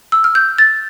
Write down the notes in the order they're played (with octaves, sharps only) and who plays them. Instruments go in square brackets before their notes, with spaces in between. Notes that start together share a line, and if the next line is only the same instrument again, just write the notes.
[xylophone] E6
F6
G6
A6